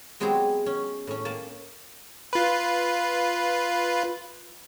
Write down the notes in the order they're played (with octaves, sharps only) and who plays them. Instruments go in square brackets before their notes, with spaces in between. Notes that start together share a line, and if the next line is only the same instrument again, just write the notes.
[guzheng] F#3 G#3 B3 C4 G4 G#4
C#4
A2 C#4
A#3 A5
[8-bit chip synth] F4 B4